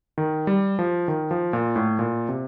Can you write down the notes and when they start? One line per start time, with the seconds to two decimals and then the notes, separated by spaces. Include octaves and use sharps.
0.18 D#3
0.47 G3
0.79 F3
1.08 D#3
1.31 F3
1.53 A#2
1.76 A2
1.99 A#2
2.29 C3